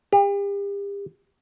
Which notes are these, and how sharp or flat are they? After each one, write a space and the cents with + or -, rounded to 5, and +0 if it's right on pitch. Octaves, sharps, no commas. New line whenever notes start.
G4 +40